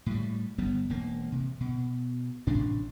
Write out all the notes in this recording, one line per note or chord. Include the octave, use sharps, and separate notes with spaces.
A2 G3
G1 G3 B3
E1 A#3
C3
B2
A1 A2 C3 D4